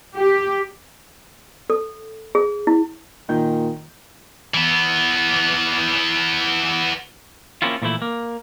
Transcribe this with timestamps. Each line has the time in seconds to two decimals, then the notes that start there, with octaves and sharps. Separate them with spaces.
0.17 G4
1.70 A4
2.35 G#4
2.67 E4
3.29 A#2 D#3 G6
4.54 E3 B3
7.62 A#3 C4 C#4 E4 F4
7.82 A#2 E3 F3 A3 E4
8.02 A#3